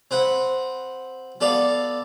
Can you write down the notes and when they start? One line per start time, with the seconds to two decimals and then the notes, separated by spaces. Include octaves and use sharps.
0.11 C4 B4 F#5
1.41 B3 A4 D5 F5